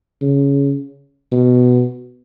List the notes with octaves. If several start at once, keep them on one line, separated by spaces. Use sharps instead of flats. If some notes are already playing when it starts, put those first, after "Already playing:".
C#3
B2